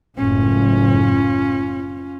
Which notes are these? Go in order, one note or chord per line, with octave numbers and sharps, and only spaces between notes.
F#1 A2 C#4 F4